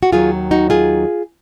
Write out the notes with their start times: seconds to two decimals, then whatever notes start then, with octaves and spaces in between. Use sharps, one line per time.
0.03 F#4
0.12 D#2 D#3 F#3 F4 G#4
0.51 D#4 F#4
0.70 F4 G#4